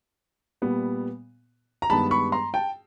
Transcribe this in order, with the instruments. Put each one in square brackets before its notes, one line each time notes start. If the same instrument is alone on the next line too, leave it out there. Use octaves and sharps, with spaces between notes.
[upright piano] A#2 G3 B3
A#5
G2 D#3 G#3 B3 A5 B5
B5 C#6
A#5 C6
G5 A5